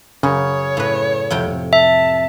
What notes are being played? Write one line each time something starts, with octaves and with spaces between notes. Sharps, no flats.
F#2 C#3 C#5
A2 B4
F2 C3 G5
E5 A5